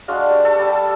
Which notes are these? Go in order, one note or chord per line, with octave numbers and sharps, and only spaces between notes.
G#3 D4 F#4 F5
G4 C#6
A4
G3 D5 A5